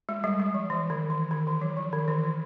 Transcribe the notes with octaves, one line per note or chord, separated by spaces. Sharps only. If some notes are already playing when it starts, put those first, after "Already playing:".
G#3
G3
G3
F3
E3
D#3
E3
D#3
E3
F#3
F3
D#3
E3
E3